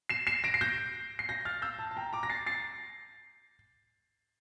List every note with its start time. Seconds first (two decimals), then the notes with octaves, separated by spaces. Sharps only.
0.09 C7 E7
0.27 C7 E7
0.44 A#6 D7
0.54 C7
0.61 G6 A#6
1.19 C7
1.29 G6 A#6
1.45 F6 A6
1.62 E6 G6
1.79 A5
1.91 A5
1.97 G5 A#5
2.13 A#5 D6
2.23 A#6
2.30 A6 C7
2.46 A6 C7